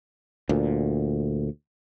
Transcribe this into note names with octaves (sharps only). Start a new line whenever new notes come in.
D2 A#2